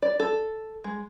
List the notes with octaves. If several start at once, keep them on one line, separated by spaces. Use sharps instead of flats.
D5
A4
G#3